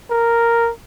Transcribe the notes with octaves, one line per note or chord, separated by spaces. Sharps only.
A#4